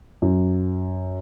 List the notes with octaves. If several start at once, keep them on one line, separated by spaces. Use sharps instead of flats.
F#2